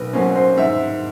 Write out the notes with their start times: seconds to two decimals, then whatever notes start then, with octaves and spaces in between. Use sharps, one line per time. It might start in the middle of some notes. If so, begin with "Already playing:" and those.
Already playing: B1 A#4 B4
0.13 B2 F#3 A#3 C#4 C5
0.36 C5
0.57 G#2 E5